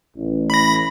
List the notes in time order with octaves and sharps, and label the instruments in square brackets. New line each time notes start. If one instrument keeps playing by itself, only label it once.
[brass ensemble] A1
[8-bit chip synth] B5 A#6